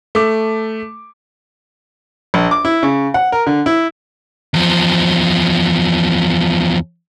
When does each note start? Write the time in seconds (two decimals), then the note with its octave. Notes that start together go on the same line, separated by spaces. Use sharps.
0.15 A3 D6
2.34 A#1
2.51 D6
2.65 E4
2.83 C#3
3.14 F#5
3.32 A#4
3.47 D3
3.66 E4
4.54 E2 F3